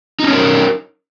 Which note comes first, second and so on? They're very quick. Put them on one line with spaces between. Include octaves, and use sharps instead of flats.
D#4 C#4 C#5 A#4